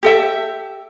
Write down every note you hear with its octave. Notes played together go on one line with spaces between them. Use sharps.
G4 A4 E5